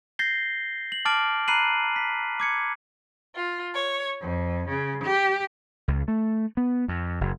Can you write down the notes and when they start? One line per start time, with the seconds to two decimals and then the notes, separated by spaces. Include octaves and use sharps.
0.19 G6 A6 A#6 C7 G7
0.92 F#7
1.05 A5 D6 F6 A6 D7 F#7
1.48 A#5 B5 F#6 C7 D#7 F#7
1.96 B6
2.40 D6 G#6 C#7
3.34 F4
3.74 C#5
4.20 F2
4.68 C#3
5.04 G4
5.88 C#2
6.08 A3
6.57 B3
6.88 F2
7.21 F#1